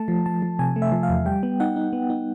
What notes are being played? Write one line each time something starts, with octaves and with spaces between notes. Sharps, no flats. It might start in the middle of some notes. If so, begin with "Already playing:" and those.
Already playing: A3 A5
F3
F3 A5
F3
C3 G#5
A3
E5
F3
F5
E2
G3 G5
B3
D#4 F#5
D#4
B3
D#4